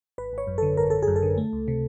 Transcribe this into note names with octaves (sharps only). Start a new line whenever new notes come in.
G#1 B4
G#1 C#5
F#2
D3 A4
G#1 A#4
G#1 A4
G#4
F#2
A4
D3
A3
C#2
C3